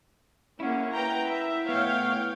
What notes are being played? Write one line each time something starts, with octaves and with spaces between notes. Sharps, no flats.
A#3 C#4 E4 F#5
B4 G5 A#5
E5
A2 B3 C#5 F5 G5